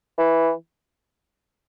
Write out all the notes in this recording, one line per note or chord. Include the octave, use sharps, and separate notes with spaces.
E3